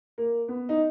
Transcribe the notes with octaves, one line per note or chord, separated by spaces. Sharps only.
A#3
B3
D#4